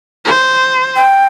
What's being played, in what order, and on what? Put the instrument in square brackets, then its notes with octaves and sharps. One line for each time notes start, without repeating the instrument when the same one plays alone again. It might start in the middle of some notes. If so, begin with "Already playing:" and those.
[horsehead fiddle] C5
[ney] G5